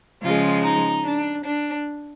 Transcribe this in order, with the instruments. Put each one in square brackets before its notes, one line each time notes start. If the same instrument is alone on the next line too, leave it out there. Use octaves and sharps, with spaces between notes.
[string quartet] C#3 F3 G#3 F4
D#4
D4
D4